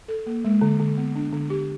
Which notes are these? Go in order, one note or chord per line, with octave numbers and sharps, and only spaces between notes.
A4
A#3
G#3
D3
D3
B3
D4
D3
G4